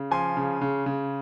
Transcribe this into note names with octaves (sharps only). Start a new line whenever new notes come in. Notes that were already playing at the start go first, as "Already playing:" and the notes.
Already playing: C#3
F3 G#5 C6
C#3
C#3
C#3